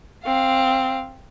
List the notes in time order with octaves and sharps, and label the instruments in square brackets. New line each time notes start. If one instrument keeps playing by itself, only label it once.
[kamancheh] C4 F5